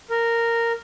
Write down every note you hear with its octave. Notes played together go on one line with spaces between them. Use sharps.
A#4